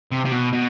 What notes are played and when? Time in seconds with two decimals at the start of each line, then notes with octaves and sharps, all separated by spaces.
0.11 C3
0.25 C3
0.32 B2
0.53 B2